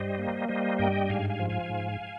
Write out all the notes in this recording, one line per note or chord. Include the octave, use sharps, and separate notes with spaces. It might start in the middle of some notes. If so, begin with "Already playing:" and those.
Already playing: G2 G3 C5 D#5
A#3
G3 C5 D#5
G2 D#5 G5
G#2 F5 G#5
F5 G#5
F3
F5 G#5
G#2